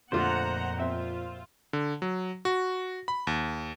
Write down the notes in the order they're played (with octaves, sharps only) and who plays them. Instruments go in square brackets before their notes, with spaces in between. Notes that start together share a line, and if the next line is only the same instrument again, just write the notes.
[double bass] F2 A#2 [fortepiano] D3 A3 F4 [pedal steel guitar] C5 [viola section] F#5 A#5
[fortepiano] C4 E5 [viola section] F4
[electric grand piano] D3
F#3
F#4
B5
D#2